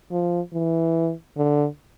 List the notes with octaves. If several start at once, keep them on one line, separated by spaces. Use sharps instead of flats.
F3
E3
D3